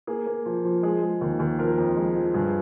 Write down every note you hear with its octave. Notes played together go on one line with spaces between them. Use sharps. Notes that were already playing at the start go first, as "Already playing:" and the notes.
A#3 G#4
A#3
F3
F3
G#3 G#4
G#3
D#2
D#2
F3 A#4
F2
G#3
F3
G2 G#4